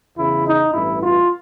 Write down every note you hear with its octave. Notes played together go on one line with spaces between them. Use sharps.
E2 C#3 E3 E4
D#4
A1 G2 E3 E4
F4